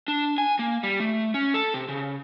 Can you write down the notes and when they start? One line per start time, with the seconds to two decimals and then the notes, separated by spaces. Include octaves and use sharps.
0.08 D4
0.38 G#5
0.59 A#3
0.83 G3
1.00 A3
1.34 C#4
1.54 A4
1.74 C3
1.88 C#3